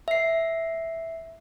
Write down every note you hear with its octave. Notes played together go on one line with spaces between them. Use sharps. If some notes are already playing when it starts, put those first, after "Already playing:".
E5 C7